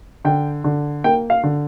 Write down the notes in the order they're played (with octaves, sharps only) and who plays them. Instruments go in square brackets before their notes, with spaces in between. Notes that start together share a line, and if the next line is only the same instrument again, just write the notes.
[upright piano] D3 G5
D3
A#3 G5
F5
D3